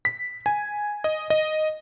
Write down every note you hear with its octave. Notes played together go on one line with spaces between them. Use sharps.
B6
G#5
D#5
D#5